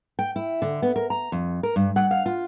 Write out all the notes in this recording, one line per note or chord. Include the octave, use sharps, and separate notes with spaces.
G5
E4
D3
B3
A#4
A#5
F2
A#4
G2
F#5
F5
F4